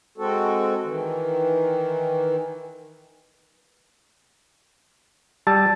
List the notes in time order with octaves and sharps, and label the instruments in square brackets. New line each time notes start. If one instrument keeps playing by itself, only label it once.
[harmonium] G#3 C4 F#4 A4
D#3 E3
[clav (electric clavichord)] G3 [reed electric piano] A5 E6 A6